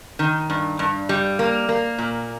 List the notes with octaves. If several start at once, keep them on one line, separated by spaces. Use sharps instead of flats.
D#3
G2
G2
G3
A#3
A#3
A#2